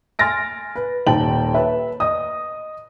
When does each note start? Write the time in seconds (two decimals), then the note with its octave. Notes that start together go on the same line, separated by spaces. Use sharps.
0.19 G#5 C6 F6 A6 A#6 D7
0.75 B4
1.06 D#1 D#2 G5 A5 F#7
1.54 B4 C#5 E5
2.00 D#5 D#6